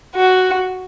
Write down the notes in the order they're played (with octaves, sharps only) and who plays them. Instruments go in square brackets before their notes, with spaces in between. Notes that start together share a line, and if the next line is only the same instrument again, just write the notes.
[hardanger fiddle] F#4